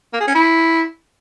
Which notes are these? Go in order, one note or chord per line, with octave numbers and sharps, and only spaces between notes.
A#3
G#4
C#4
E4